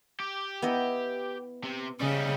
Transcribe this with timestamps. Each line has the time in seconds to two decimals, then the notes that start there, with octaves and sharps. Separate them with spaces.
0.20 G4
0.62 B3 E4 D#5
1.63 C3
2.01 C#3 G3 C#4 D#4